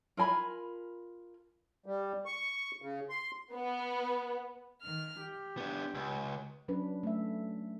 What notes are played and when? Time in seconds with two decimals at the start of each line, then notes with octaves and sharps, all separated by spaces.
0.17 F4 A#4 G#5 B5
1.86 G3
2.26 C#6
2.82 C#3
3.10 C6
3.54 B3
4.81 D#3 F6
5.20 G4
5.57 B3 D4
5.95 C#2
6.68 F#3 C#4 D4 B4
7.03 A3 E5